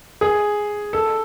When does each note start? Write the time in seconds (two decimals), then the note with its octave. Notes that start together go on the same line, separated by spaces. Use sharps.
0.21 G#4
0.93 A4